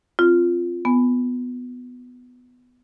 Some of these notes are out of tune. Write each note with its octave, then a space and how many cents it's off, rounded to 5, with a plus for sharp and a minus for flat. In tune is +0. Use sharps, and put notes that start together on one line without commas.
C4 +0 F4 -5
B3 +10 G#5 +0